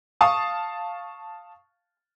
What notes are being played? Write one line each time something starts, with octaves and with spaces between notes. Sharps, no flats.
F5 A5 C#6 D#6